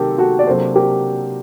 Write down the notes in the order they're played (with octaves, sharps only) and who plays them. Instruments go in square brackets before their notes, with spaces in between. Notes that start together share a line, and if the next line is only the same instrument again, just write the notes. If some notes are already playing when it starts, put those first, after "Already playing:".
Already playing: [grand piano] C3 D#3 F#3 A3 C4 [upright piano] G4 A4 A#4
[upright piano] F#4 A4
D5
[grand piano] C3 F#3 A#3 D4 [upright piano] A4 C5
[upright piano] G4 A#4